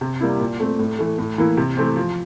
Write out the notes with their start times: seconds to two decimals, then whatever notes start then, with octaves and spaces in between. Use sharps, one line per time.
0.01 C3
0.21 G3 A#3 E4
0.40 A#2
0.60 A3 C4
0.79 A2
0.99 E3 A3
1.18 A2
1.38 E3 A#3 E4
1.57 C3
1.77 E3 A3 C4
1.96 F3